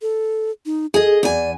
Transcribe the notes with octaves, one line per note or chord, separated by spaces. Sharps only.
A4
D#4
G#4 A4 D#5
E2 D5 G#5